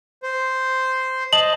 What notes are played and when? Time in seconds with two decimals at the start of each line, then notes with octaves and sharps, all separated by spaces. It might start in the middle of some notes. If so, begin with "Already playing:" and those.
0.23 C5
1.33 D#5 A5 F#7